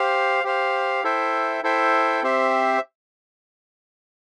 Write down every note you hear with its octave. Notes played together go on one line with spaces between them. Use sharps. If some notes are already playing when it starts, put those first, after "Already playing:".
Already playing: G4 C5 F5
G4 C5 F5
E4 A4 C5 E5 G5
E4 A4 C5 E5 G5
C4 G4 C5 E5